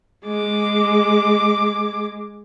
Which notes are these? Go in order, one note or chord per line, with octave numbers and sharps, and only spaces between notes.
G#3 D6